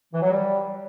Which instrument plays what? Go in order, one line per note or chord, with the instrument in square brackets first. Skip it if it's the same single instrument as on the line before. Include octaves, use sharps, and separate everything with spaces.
[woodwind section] E3
F#3
G3